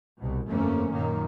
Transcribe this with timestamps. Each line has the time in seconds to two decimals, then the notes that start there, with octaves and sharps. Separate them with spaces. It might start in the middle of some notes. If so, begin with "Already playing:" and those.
0.19 C2 B2
0.48 G1 F2 A3 A#3 C#4
0.93 F#2 A#2 D#3 A#3